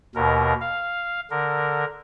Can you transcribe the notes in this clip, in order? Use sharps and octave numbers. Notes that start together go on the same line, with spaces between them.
D#2 B2 A#4
F5
D3 A#4